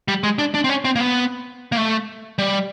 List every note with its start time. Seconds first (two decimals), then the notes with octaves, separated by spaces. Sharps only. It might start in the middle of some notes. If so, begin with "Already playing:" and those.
0.08 G3
0.23 G#3
0.39 D4
0.54 D4
0.64 C4
0.69 C#4
0.85 C4
0.96 A#3
1.01 B3
1.72 A#3
1.77 A3
2.39 G3